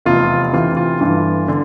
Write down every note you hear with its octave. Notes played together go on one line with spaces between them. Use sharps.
F1 E2 C3 F4
D2 C3 E3 F4
F4
G1 G2 E3
D3